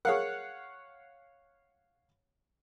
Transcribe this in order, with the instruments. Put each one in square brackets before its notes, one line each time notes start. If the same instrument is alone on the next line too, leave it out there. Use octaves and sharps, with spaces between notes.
[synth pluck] G#4 A#4 [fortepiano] C#5 F5 F#5